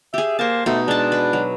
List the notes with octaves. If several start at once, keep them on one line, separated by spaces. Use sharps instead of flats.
G4 G#4 E5
A#3 C5 A5
B2 A3 D#4
G#3 D4 A5
B4
F#3